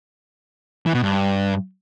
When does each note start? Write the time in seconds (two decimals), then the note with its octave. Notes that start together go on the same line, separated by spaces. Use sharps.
0.86 E3
0.94 B2
1.02 G2